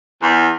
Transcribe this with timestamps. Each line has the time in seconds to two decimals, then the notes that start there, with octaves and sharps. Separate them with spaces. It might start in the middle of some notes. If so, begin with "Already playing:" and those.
0.21 E2